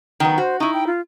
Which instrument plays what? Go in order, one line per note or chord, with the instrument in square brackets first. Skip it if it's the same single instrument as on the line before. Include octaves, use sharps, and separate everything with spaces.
[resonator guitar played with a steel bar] D#3 F#3 B3
[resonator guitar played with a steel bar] F#4 [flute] C5
[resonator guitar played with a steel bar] D#4 E4 [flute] C#6
[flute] G5
F4